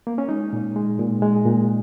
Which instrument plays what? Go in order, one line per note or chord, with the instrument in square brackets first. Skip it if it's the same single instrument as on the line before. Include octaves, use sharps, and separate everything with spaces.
[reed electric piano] A#3
C#4
G#3 D#4
A#2
G#3
A#2
G#3
A#2